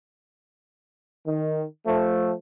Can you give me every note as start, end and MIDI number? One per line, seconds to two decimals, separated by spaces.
1.27 1.65 51
1.86 2.33 53
1.86 2.33 57